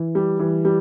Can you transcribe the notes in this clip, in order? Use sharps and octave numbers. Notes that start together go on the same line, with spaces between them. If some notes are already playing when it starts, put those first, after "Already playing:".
Already playing: E3
G3
E3
G3